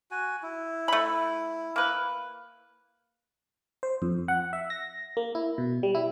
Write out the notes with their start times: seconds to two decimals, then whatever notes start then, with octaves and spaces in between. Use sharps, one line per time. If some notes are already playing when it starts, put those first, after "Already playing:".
0.11 F#4 G#5
0.43 E4
0.88 A3 B5
1.76 A#3 B4
3.83 C5
4.02 F2
4.28 F#5
4.53 E5
4.70 A#6
5.17 A#3
5.35 E4
5.58 B2
5.83 G3
5.95 E4